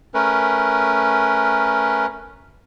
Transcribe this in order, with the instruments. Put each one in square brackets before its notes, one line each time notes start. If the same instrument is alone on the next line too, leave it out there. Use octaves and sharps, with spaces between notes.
[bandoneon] A3 C#4 A#4 B4